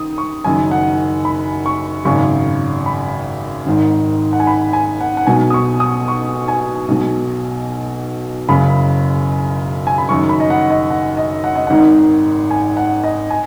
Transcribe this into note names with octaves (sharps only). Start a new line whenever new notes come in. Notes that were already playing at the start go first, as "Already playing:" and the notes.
Already playing: D#3 D#6
C#6
F#1 F#2 D#3 G#5
F#5
B5
C#6
G#1 F#2 C#3 C#6
B5
G#1 G#2 D#3
F#5
G#5
B5
G#5
F#5
F#5
B1 B2 G#5
D#6
C#6
D#6
C#6
G#5
B1 B2
F#1 F#2 C#3 B5
G#5
B5
F#1 F#2 D#3 C#6
B5
D#5
F#5
D#5
F#5
D#5
F#5
D#5
G#1 G#2 D#3 F#5
G#5
F#5
D#5
G#5